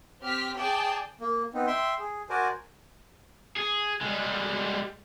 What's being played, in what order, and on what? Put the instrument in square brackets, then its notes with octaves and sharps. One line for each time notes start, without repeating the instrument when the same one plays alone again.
[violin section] C4 G4 F6 B6
G#4 D5 G5 A5
[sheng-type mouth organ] A#3
B3 C4 D#4
E5 G5 C6
G#4
F#4 A#4 C5 D5 G#5 A5
[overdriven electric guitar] G#4
G3 G#3